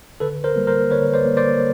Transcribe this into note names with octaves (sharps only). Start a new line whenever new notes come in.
D3 A4 B4
A#4 C5
G3 A#3
A#4 C5
D3 B4 C#5
C5 D5
G3 A#3
C5 D5